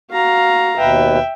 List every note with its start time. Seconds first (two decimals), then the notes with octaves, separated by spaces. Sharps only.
0.12 F#4 F5 A#5
0.78 D#2 B2 B4 E5 G5